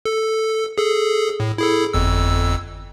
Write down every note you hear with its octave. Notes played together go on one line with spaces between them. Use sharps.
A4
G#4 A4
A2
E4 G#4 A4
G1 F2 E6